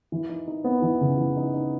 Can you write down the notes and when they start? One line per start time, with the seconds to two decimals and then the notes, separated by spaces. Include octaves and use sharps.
0.12 E3
0.30 D#4
0.48 D#4
0.64 B3
0.82 E3
1.01 C#3
1.18 E3
1.37 D#4
1.54 D#4